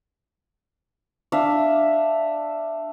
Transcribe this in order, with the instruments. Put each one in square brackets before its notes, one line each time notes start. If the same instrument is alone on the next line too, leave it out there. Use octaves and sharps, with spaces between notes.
[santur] D4 E5 F5